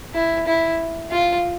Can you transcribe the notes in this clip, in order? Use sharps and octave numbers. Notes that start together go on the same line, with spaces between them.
E4
E4
F4